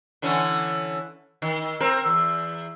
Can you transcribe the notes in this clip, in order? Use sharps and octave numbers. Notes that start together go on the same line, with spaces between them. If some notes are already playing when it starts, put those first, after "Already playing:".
D3 E3 C#4
D#3
C4 A#4
E2